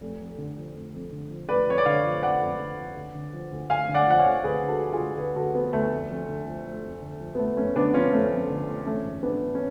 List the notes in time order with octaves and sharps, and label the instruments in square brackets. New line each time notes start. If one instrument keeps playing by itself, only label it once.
[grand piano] F1
F2
D3
F3
F1
F2
D3
F3
F1 B4 D5
F2 C#5
D5
D3 C#5 F5
F3
F1 D5 F#5
F2
D3
F3
D2
D3
F3
D2
D2 F5 G#5
D3
D5 F#5
F3 F#5
C#5 F5
D2
D2 G#4 B4
D3
F#4 A4
F3
F4 G#4
D2
D2 G#4 B4
D3 F#4 A4
F3 B3
D2 A3
F1
F2
D3
F3
F1
F2
D3
F3
B3
F1 A3
F2 A3 C#4
D3 B3 D4
F3 C#4 F4
F1 A3 C#4
F2
D3
F3
A1 A3 C#4
G#2
F3 B3 D4
A1
C#4